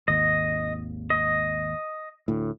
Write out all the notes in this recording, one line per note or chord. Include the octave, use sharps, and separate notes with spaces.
G#1 D#2 D#5
D#5
D2 A2